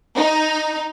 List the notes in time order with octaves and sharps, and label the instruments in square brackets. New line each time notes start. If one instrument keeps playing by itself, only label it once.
[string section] D#4